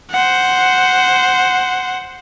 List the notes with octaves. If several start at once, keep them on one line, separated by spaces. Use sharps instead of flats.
C5 F#5